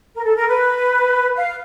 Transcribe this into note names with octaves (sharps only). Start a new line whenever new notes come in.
A#4
A4
A#4
B4
F5